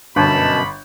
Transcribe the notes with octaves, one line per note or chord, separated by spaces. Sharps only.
G1 F#2 B2 A5 B5